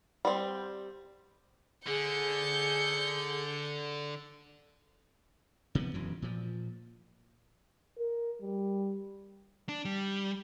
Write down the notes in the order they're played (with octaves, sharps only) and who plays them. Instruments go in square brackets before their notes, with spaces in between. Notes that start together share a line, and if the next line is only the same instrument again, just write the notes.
[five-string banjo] G3 C4
[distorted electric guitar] D3 [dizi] G#4 [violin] G6 C#7
[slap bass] C3 F3 G#3 B3
E1 F#2 E3
A#2 F3
[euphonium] A#4
G3
[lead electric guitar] D4
G3